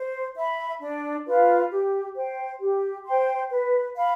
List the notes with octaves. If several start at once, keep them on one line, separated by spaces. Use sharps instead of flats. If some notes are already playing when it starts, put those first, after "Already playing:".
Already playing: C5
E5 B5
D4
F4 B4 F5
G4
C5 G5
G4
C5 G5 C6
B4
F5 B5